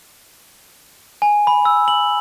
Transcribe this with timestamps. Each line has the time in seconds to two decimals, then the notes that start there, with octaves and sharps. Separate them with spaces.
1.22 G#5
1.47 B5
1.65 E6
1.88 F#7